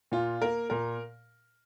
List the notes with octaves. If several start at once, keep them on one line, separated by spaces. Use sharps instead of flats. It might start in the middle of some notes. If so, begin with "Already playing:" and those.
A#2 F4
A#3 A#4
A#2 A#4